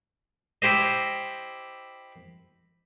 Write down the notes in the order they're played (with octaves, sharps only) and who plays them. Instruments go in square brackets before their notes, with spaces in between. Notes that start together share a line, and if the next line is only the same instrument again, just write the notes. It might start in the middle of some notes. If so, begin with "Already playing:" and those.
[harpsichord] E4 G4 C5 D#5